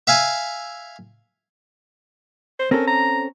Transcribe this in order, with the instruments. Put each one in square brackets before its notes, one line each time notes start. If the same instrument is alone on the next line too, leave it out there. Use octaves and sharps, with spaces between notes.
[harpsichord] E5 F5 G#5
[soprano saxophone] C5
[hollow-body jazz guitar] C4 C#4 A4 [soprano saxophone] A#4
[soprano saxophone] A#5